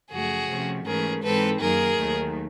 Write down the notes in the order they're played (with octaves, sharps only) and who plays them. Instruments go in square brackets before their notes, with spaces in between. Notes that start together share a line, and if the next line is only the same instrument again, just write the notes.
[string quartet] F#2 C#3 F3 A3 F#4 G#4
C3 F3 A3 C#4
G#2 E3 A3 C#4 G#4 A#4
G#2 E3 G#3 C4 D#4 A4 B4
F#2 D#3 F#3 A#3 G#4 A#4
D#2 D#3 F#3 A3